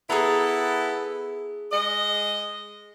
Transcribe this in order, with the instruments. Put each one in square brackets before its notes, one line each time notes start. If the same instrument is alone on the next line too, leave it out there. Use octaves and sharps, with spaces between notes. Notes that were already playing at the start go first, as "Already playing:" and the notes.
[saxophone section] B3 E4 A4 [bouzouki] G#4 A#5
[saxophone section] G#3 D#5